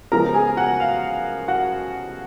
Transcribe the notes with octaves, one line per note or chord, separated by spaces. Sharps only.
C#3 F3 G#3 B3 A#4 A#5
G#4 G#5
F#4 F#5
F5
F#4 F#5